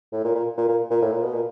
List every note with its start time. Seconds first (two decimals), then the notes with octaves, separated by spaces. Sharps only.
0.12 A2
0.24 A#2
0.35 A#2
0.58 A#2
0.69 A#2
0.90 A#2
1.02 A2
1.12 A#2
1.23 B2
1.34 A#2